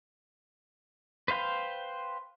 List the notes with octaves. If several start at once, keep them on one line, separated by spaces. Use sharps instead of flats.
B4 C5 F5 G5